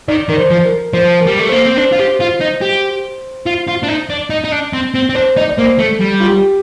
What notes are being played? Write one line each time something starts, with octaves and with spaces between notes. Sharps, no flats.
D#3 D5
D#3 A#4
C5
F3
A#4
F3 C5
A#4
G3
A3
A#3 C5
C4
D4 C5
F4
G4
F4
D#4
G4
F4
F4
D4
D#4
D4
D#4
D#4
D4
C4
C4
C4
D4 C5
D#4 D5
D5
A#3 C5
A3 A4
G3
F4
G4